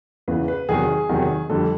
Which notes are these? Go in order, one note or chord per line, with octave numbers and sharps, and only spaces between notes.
E2 C#3 E3 B4
B4
E2 C3 D#3 F#3 G#4
E2 C3 D#3 F#3
F2 D3 G3 A4